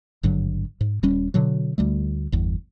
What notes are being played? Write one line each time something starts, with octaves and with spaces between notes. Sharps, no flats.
G#1 G2 D3 F#3
G#2
D#1 G3 C#4
B2 D3 F#3
D2 G3 A3
G1 E2